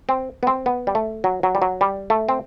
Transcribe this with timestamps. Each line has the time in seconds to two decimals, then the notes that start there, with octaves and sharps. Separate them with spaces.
0.09 C4
0.43 B3
0.47 C4
0.66 B3
0.87 G3
0.95 A3
1.24 F#3
1.43 F#3
1.55 G3
1.62 F#3
1.81 G3
2.10 A3
2.29 C4